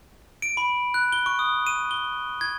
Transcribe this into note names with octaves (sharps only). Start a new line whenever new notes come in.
D7
B5
F#6
G7
C#6
D#6
D#7
G7
G#6